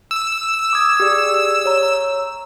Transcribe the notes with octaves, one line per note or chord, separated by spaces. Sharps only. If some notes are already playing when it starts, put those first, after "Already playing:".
E6
D6 D#6 G#6
G4 G#4 D5
C#5 A#5